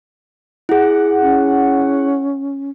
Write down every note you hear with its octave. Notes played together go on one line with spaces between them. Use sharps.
E4 G#4 F#5
C#4